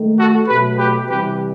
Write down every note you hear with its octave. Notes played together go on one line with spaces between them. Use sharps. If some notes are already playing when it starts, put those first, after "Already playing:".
Already playing: D#3 A3
F#4 A4
B2 F#3 A3 G4 B4
G4 B4
C3 E3 G3 G4 B4